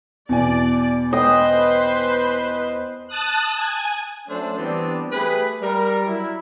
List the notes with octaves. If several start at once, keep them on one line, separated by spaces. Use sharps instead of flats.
E2 B2 D5 G#5
B4 C5 D#5 G5
A5 D#6 F#6
G#5
F#3 A3 C#4 D4 A4 C5
E3 G3 B3 C4 D4
A3 G4 G#4 B4
G3 A#4
F#3 E4